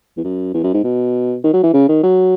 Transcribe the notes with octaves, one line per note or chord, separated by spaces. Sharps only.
E2
F#2
E2
F#2
G#2
B2
D#3
F#3
E3
C#3
D#3
F#3